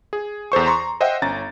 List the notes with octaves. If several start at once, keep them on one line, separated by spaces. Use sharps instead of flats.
G#4
E2 A4 C5 C#6
A#5 C6 C#6
C5 D#5 E5 F#5 G5
G1 C#4 A#5 A6